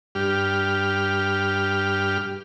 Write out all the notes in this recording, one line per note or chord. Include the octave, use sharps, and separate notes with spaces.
G2 G4 F6